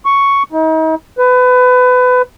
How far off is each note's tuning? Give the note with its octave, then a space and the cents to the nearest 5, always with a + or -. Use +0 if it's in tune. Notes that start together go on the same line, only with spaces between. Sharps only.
C#6 +5
D#4 +40
B4 +25